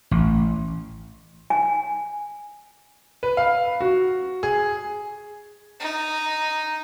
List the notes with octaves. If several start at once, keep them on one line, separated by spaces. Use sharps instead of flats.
A1
G#5
B4
F5
F#4
G#4
D#4